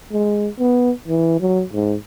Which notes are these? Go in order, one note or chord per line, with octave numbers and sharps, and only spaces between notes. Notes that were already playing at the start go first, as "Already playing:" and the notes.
G#3
B3
E3
F#3
G#2